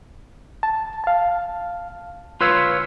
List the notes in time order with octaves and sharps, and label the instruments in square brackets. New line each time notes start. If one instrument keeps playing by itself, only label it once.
[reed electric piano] A5
F5 A5
[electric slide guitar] F4 B4 C#5 [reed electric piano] C6 E6